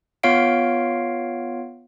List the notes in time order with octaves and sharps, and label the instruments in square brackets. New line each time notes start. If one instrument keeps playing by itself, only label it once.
[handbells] B3 F4 C#5 F5 D7